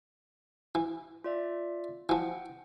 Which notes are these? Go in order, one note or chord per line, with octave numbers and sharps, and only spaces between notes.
E3
F4 D5 E5
E3 F3 F#5 G5